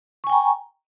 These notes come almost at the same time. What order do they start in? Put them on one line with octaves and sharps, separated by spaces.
C#6 G#5 G5 A#5